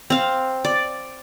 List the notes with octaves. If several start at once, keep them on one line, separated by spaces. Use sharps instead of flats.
C4 F5
D5